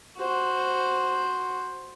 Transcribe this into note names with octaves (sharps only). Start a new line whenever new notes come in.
F#4 C5